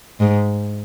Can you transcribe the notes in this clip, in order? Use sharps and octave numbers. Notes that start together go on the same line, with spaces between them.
G#2